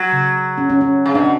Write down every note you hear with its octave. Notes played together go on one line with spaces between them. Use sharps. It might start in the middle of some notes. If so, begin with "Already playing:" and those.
Already playing: F#3
C#3
C#4
C#4
C#4
C#3
B2 D4